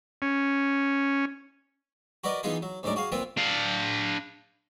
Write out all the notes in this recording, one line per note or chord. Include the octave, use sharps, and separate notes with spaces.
C#4
F#4 A#4 B4 D5 D#5
E3 B3 D#4 F4 G#4
F#3
D2 G#2 F#3 A#4 D5
F#4 G#4 F5
A#2 C4 F4 A#4 B4
D4 F5